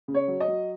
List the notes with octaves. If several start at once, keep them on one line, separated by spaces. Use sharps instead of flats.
C#3
C#5
F#3
D#5
F#3